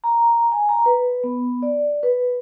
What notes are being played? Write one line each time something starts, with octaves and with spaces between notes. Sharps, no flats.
A#5
G#5
A#5
B4
B3
D5
B4